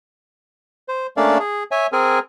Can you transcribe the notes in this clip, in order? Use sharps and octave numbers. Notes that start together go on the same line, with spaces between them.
C5
A3 A#3 C#4 D4 D5 F5
G#4
C#5 E5 G#5
C4 G#4 A#4 G#5